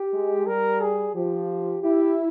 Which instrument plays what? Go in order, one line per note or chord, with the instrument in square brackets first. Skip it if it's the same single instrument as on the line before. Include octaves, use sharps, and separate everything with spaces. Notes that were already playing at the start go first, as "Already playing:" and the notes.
Already playing: [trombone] G4
[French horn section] G#3
[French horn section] G3 [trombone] A#4
[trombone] G#4
[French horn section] F3 [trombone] G4
[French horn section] E4 [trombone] G4